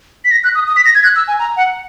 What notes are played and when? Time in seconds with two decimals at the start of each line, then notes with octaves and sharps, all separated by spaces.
0.25 B6
0.31 A#6
0.44 F#6
0.55 D#6
0.68 D#6
0.76 B6
0.85 A#6
0.95 G#6
1.04 F#6
1.16 E6
1.28 G#5
1.39 A#5
1.57 F#5